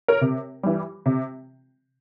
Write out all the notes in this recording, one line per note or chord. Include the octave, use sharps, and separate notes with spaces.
A#4 C#5
C3
E3 G3
C3